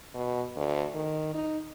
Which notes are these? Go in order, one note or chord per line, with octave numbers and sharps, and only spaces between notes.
B2
D2
D#3
D#4